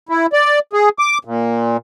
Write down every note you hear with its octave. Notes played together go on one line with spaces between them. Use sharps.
E4
D5
G#4
D6
A#2